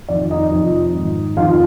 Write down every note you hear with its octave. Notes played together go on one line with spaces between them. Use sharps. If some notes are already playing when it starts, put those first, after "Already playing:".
F2 D#3 D5
D#4 D#5
F2 C3 F3
G#2 D#3
F2 D#3 F4 F5